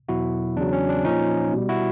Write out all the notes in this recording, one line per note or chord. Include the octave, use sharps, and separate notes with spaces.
E2 B2 F#3 E4 F#4
E2 C#3 F#3 D4
C#4
D4
A#2 F3 C#4 D#4
B2 G3
E4 F#4